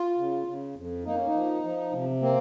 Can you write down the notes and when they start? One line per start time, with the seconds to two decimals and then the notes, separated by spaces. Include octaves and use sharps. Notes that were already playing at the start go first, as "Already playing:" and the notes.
Already playing: F4
0.18 C#3
0.47 C#3
0.76 F2
1.05 A#3 D#4
1.16 C#4
1.27 D#4
1.34 F3
1.63 F3
1.93 C3
2.22 A#3 C4